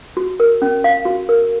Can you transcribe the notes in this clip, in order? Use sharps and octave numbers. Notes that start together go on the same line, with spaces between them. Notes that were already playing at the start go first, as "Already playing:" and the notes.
F#4
A#4
C#4
F5
F#4
A#4